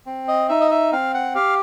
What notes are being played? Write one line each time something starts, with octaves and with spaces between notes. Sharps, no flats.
C4
D#5
D#4 E5
D#5
E5
C4 F5
F#5
G4 F5